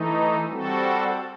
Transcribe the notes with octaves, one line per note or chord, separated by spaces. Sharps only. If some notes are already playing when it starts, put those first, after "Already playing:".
Already playing: E3 A3 D#4
G3 C4 F#4 A4